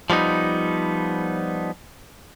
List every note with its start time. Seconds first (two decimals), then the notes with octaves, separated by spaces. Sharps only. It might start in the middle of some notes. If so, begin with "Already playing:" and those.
0.10 F3 G3 B3 D#4